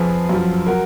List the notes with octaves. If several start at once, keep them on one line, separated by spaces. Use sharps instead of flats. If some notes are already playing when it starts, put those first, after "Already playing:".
Already playing: F2 F3 G#4 B4
F#2 F3
F#3 F#4 A#4